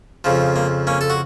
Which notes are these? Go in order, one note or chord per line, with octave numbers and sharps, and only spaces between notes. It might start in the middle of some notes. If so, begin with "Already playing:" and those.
F2 C#3 F3
A#3
A#3 C#4
A4
F#4